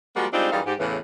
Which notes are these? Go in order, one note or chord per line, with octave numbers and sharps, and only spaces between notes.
F3 G3 G#3 A#3 F#4
G3 G#3 C4 D4 D#4 F4
F#2 E3 G3 D#4 G#4 F5
G#2 G4
E2 A2 C#3 E3